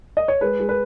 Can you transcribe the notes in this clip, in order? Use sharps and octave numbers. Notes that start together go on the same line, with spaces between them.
D#5
C#5
G#3 B4
G#3
B4